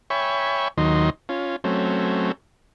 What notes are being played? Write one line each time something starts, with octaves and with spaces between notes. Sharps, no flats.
C#5 E5 G5 G#5 B5 C#6
D#2 D#3 F#3 D#5 C6
C#4 F4
F#3 A3 C4 C#4